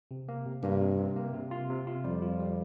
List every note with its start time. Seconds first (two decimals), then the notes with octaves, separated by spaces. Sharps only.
0.11 C3
0.29 A#3
0.46 C3
0.63 G2 A#3
0.81 C3
0.99 C3
1.16 A#3
1.34 C3
1.51 F4
1.70 C3
1.87 F4
2.04 F2 G3
2.22 F4
2.40 G3